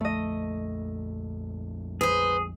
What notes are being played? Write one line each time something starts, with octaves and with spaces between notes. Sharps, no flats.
A#1 F2 A3 D#5
G#4 B4 C5